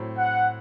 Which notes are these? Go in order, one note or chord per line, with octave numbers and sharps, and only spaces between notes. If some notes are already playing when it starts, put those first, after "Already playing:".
Already playing: A2 F#3 C4
F#5